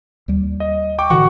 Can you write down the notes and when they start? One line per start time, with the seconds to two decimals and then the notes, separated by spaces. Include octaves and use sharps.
0.28 D#2 G3
0.60 D#5
0.98 G5 C#6 D6
1.10 A2 D3 E3 F#4 F#5 C#6